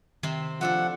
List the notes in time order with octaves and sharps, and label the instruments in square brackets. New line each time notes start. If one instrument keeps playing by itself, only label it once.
[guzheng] C3 C4 [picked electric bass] D#3
[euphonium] F3 [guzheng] A3 D4 A4 [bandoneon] F#5